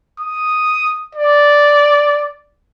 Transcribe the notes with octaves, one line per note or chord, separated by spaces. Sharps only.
D#6
D5